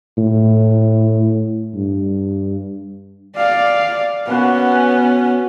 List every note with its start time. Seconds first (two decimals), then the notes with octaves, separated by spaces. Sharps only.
0.18 A2
1.75 G2
3.36 D5 F5
4.27 B2 B3 C#4 F#4